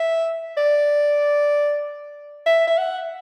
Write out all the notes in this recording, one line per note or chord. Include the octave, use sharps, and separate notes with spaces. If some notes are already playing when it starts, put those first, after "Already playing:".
Already playing: E5
D5
E5
E5
F#5